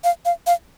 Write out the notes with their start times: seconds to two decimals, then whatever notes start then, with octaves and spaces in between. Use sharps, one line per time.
0.04 F5
0.25 F5
0.47 F5